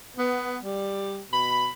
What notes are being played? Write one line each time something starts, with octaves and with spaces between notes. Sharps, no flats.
B3
G3
B2 B5